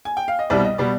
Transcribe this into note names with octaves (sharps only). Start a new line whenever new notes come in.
G#5
G5
F5
D#5
C2 B2 G3 D5
D#5
B2 G3 D5